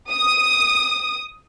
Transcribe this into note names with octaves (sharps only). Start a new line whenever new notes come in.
D#6